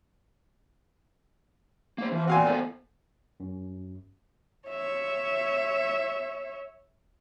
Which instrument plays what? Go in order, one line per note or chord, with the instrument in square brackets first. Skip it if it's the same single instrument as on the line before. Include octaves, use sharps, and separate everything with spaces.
[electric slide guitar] A#3 C5
[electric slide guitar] E3 [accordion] F3
[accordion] A#2 C4 [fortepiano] F#4 F5 G#5
[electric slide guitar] B3 A4 C5
[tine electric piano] F#2
[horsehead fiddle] C#5 E5